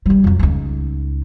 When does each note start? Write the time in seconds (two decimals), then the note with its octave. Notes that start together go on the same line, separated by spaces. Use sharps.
0.06 E3 G3
0.24 F2 F#3
0.39 C#2 D#4